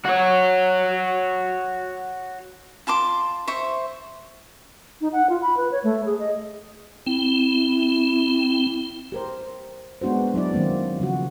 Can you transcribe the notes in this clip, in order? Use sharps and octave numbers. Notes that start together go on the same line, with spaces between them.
F#4 C#5
F4 A5 C6 D6
C5 E5 C#6
D#4
F#5
F4
B5
B4
C#5
A3
G#4
D#5
C4 E4
G4 A#4 C5
G#3 B3 D4 F#4 C5
F#3 D4 E4 D5
D#3 F#3 A#3 C4
C#3 F3 F#4